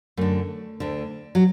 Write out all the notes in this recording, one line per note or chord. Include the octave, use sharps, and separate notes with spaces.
F#2 D3 A3
D2 D3
F#3